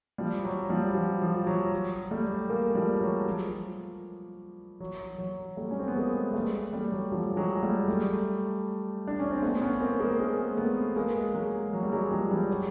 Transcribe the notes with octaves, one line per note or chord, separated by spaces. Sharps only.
F3 G3
F#3
F3 G3
F3
F3
F#3
F#3
G3 A3
G#3 A#3
F3 G3
F#3
F3
F#3
F#3
G3 A3
C#4
C4
B3
G#3 A#3
A#3
G3 A3
G3 A3
F#3
F3 G3
F#3 G#3
G3 A3
G3 A3
D4
C#4
C4
A3 B3
B3 C#4
A#3 C4
G#3 A#3
G#3 A#3
A3 B3
G#3 A#3
F#3 G#3
F#3
G3
F#3 G#3
F3 G3
F3 G3
F#3